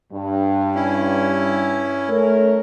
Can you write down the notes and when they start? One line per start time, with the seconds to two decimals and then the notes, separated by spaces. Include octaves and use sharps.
0.13 G2
0.75 C#4 E4
2.09 A3 A#4 C#5